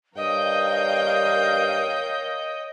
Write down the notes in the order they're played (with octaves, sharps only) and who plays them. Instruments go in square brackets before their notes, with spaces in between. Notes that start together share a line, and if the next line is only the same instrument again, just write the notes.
[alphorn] G2 [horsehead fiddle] A#4 F5 [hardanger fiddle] C#5 G5 [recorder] D#5